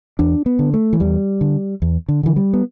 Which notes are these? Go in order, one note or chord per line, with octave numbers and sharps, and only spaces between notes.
E2 D4
B3
D3
A3
E3
E2 G3
D3
E2
D3
D3 E3
G3
B3